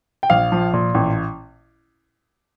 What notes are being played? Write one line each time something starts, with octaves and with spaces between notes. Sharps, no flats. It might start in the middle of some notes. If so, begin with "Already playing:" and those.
G5
A#1 F5
F3
A#2
A1